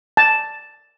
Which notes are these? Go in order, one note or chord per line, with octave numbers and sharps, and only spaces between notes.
A5